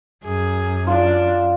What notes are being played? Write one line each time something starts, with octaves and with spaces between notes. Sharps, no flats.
F#2 G#4
D4 F4